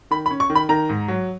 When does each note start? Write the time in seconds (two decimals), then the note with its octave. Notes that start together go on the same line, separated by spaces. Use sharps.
0.11 D#3 B5
0.26 B5
0.31 C#4
0.40 C#6
0.50 D#3
0.55 B5
0.69 D#3 A#5
0.89 G#2
1.08 F#3